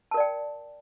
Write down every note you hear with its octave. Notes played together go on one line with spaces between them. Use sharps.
A#4 D5 G5 A5